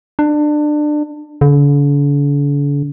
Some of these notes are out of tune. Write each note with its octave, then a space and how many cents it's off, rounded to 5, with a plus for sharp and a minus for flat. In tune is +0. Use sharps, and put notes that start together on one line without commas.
D4 +25
D3 -45